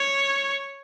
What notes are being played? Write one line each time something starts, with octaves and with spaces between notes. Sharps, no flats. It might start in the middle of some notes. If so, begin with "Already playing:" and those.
Already playing: C#5